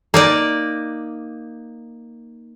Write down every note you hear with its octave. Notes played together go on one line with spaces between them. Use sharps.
A#3 D#4 D5